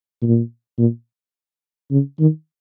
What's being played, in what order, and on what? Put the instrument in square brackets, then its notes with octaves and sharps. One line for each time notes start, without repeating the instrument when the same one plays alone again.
[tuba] A#2
A#2
C#3
D#3